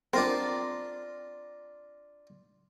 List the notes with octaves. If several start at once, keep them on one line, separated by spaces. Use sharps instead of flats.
C4 D4 F4 A#4